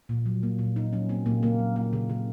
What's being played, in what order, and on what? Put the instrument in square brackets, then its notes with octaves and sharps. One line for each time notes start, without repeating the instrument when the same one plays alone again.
[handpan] A#2
F#3
A#3
A#2
A#2 D#4
F#3 C#4
A#3 C4
A#2 A#3
C#3 A#3
F#3
A#3
C#3
C#3